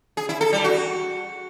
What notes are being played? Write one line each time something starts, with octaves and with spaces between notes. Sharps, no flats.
G#4
E4
A4
G3
F#4